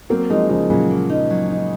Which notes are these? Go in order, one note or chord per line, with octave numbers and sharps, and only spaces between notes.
F#3 A#3 C4
F3 G#3 D#4
C#3 F3 D#4
A#2 C#3 F#3
A#3
D#4
F#3
D#4